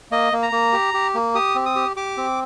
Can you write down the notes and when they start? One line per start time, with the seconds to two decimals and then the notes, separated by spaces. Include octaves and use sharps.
0.12 A#3 D#5
0.33 A#3
0.43 A#5
0.52 A#3
0.73 G4
0.94 G4
1.15 A#3
1.35 G4 D#6
1.55 C4
1.66 D#6
1.76 G4
1.96 G4 D6
2.17 C4